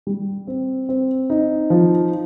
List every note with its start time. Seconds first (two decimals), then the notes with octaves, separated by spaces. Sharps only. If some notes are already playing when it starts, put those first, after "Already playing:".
0.07 G3
0.47 C4
0.89 C4
1.30 D#4
1.70 F3